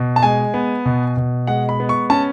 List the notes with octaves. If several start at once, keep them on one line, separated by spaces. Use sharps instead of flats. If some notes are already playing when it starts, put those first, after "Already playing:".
Already playing: B2
A5
G#3 G#5
B3
B2
B2
G#3 F#5
B5
B3
C#6
C#4 A5